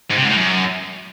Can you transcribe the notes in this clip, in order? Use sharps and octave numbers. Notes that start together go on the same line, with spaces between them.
G#2
C3
G#2
A2
F#2